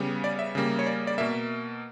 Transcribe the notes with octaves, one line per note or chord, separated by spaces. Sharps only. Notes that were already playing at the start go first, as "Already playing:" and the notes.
Already playing: C#3 G3 B3
D5
E5
C#3 G3 A#3
C#5
D5
D5
B2 A#3 E5